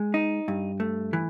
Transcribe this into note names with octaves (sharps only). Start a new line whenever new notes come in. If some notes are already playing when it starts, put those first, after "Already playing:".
Already playing: G#3
D#4
G2
A3
E3